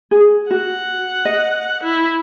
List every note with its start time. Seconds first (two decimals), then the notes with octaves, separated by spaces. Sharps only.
0.11 G#4
0.51 F#4 F#5
1.25 D#5
1.83 E4